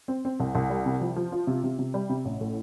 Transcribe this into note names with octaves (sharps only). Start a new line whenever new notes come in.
C4
C4
C2
C2
G3
C3
F3
F3
F4
C3
C3
C3
G3
C3
A1
A2